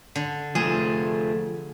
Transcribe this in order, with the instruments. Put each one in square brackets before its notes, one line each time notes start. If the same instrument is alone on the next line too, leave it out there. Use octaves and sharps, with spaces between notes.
[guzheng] D3
[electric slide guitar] F3 A3 [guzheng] G#4